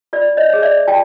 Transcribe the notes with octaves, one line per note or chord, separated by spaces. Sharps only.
F4 D5
C#5 D#5
G#4 C#5
D5 E5
F4 G5 A5